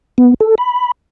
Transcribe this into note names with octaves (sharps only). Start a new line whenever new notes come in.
B3
A4
B5